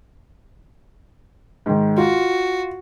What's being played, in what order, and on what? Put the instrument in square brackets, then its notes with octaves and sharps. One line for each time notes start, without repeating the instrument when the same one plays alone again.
[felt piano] G#2 D#3
[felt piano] F4 [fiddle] F#4